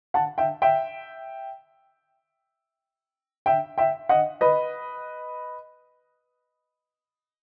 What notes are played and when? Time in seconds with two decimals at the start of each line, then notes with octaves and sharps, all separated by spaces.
0.14 F#5 A5
0.38 E5 G5
0.62 E5 G5
3.46 E5 G5
3.78 E5 G5
4.09 D#5 F#5
4.41 B4 D#5